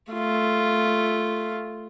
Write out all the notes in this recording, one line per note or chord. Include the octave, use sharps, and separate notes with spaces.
A3 F4